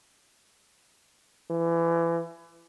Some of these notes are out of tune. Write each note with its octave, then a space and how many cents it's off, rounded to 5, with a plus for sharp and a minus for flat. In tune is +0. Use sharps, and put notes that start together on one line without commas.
E3 +30